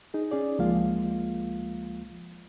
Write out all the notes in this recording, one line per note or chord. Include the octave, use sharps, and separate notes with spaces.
D#4 G#4
C#4 G#4 D5
C#2 F3 G#3 A#3 F4 F5